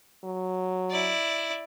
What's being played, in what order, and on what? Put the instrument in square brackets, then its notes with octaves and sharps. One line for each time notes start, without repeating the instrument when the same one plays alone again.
[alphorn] F#3
[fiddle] E4 D5